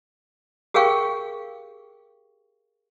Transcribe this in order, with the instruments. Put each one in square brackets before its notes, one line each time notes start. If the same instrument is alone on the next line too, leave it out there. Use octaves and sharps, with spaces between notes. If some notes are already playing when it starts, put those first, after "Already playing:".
[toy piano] G4 G#4 A#4 F5 G5 C#6